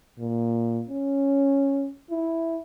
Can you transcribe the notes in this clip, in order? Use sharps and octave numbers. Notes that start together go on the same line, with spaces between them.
A#2
C#4
E4